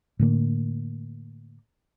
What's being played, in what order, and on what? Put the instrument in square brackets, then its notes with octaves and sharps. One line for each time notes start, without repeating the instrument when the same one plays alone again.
[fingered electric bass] A2 D3 A#3